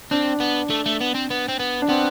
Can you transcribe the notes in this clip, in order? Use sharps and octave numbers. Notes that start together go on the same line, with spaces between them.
C4 D4
B3
A3
A3
B3
C4
B3
C4
B3
D4
B3 C4